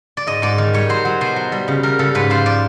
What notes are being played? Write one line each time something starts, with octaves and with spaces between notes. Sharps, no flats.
D5
G#2 D#5
G#2 D5
D#3
G3 C#5
F#3 C5
F#3
B2 C5
F#3
G3
C#3
G3 A#4
C#3 A4
G#2 B4
F3 C5
F3 D5